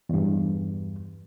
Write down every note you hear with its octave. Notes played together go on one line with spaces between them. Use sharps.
E2 G2